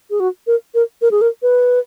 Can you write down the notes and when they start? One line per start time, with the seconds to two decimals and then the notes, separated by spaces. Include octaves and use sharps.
0.10 G#4
0.20 F#4
0.47 A#4
0.74 A#4
1.02 A#4
1.11 G#4
1.21 A#4
1.42 B4